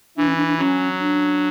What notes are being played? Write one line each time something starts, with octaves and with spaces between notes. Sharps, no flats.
E3 D4
C#4
D4
D4
F#3 C#4
D4